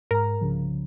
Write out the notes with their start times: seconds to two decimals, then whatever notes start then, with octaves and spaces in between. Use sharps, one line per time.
0.11 G#2 A#4 A#5
0.41 C2 C#3 F3